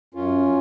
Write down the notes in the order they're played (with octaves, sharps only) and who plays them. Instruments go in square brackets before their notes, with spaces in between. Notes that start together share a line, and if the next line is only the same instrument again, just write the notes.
[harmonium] F#2 C#4 F4